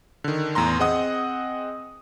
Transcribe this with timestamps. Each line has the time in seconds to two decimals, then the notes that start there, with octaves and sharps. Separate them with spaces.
0.24 D3 D#3
0.55 E2 A2 A#5 C6
0.79 C4 G#4 D#5 F#5 D#6